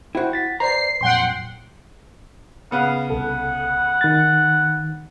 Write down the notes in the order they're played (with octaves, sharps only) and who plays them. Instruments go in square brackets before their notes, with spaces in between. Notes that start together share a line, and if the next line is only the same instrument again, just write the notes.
[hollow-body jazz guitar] E4 F#4 [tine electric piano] C5 E5 G5
[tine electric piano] F#5 A6 B6
[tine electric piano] B4 C5 D5 [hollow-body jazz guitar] A#5 [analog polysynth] C7
[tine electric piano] F2 A#2 F#3 [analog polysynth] F#5 G5 C6
[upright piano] C#3 B3 F#6 [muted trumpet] F5
[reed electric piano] C2 A4 [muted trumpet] F#5
[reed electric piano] D#3 A6